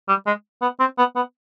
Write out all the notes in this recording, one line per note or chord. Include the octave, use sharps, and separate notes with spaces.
G3
G#3
B3
C4
B3
B3